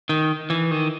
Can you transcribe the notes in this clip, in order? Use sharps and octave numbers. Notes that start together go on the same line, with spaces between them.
D#3
E3
D#3